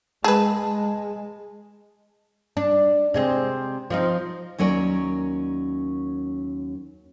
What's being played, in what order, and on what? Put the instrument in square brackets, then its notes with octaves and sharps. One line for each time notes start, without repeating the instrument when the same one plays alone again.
[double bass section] G#3 [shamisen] G#4 B4 [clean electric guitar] A5
[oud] D4
C3 G#3 C4
F3 C4 D#4
[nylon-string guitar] D#2 F#3 C#4 A#4 D5